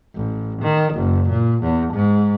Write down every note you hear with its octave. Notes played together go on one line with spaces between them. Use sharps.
A1
D#3
F#1
A#2
E2
G#2